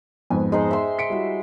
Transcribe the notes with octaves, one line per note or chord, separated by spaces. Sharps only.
F2 G#2 B3 G#5
G#3 D#4 C5
E5 C6
B6 C#7 D7
G3 E4 F#4